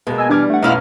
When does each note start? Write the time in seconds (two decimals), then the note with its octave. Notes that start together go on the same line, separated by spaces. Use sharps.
0.07 B2 G#3 A#3
0.18 D#5 G#5 E6
0.30 E3 G3 D4 G#5 D6 F6 G#6
0.50 A3 F#5
0.62 B1 F#2 B2 G#3 E4 F4 F6